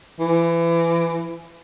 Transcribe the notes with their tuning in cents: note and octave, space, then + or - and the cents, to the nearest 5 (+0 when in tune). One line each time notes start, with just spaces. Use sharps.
E3 +30